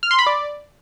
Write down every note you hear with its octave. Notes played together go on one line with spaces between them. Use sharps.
F6
C6
B5
D5